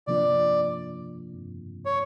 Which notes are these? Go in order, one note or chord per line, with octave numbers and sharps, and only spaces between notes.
C3 F3 A#3 D4 F4 D5
C#5